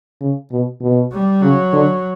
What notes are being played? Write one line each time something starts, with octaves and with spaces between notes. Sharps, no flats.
C#3
B2
B2
G3
C#3 F#3
D3